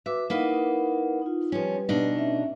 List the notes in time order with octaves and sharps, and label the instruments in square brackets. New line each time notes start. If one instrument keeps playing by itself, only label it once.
[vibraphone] F#4 B4 D6 [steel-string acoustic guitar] E5
[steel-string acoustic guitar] A#3 B4 D#5 [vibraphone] D#4 E4 F#5
[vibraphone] D#4 F4
[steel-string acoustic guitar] F3 C#4 [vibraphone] G3 G4 B4
[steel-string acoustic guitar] B2 D4 D#4
[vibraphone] C#4 E5